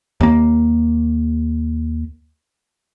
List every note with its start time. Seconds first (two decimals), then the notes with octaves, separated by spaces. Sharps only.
0.20 D#2 A#3